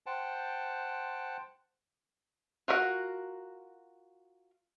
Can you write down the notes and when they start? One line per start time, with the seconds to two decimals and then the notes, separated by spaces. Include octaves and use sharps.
0.06 C5 F#5 G5 A5
2.68 F4 F#4 A#4 E5 F#5